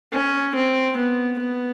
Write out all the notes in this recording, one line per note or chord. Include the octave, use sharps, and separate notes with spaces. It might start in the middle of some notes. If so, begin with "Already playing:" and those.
C#4
C4
B3
B3